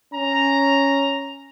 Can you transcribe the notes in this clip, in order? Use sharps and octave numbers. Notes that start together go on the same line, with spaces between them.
C#4 A#5